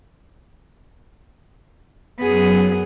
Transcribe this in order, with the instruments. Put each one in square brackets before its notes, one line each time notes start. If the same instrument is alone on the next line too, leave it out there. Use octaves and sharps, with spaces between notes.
[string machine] F#2 F#3 [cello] B3 G#4